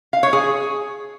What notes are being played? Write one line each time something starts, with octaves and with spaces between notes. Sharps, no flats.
F5
C#5
G#4